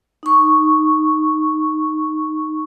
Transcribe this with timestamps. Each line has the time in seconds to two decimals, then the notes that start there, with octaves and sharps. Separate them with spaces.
0.23 D#4 C#6